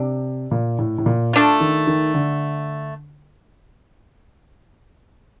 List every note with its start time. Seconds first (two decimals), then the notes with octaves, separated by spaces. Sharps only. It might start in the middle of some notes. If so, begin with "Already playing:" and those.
Already playing: C3 D4
0.51 A#2
0.79 A2
0.98 A2
1.06 A#2
1.33 A3 D4 F4
1.60 D#3
1.87 D#3
2.14 D3